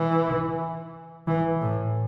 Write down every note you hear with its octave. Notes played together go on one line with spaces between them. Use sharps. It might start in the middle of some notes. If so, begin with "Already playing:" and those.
Already playing: E3
E3
A2